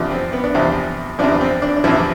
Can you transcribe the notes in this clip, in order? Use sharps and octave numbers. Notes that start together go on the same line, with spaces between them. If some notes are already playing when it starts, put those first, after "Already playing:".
Already playing: E2 C3 F3 D4
C4
B3
D4
E2 C3 F3 C4
E2 C3 F3 D4
C4
D4
D4
E2 C3 F3 E4